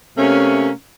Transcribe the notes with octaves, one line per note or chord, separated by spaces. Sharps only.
C3 A3 A#3 C#4